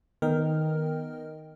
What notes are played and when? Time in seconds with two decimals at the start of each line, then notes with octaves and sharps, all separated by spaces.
0.22 D#3 B3 A#4 D#5 G5 F6